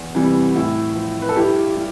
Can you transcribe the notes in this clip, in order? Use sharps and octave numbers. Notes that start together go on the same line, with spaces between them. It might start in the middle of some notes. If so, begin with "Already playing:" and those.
Already playing: E2
C3 E3 G3
A2 E4
F3
B4
A4
G2 E4 G4
G3